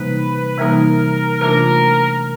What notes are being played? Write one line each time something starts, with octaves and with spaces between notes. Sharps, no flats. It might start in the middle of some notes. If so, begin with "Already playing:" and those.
Already playing: C3 E3 G3 A#3 D#4 B4
C3 E3 G3 A#3 D#4 A#4
C3 E3 A3 D4 F4 A#4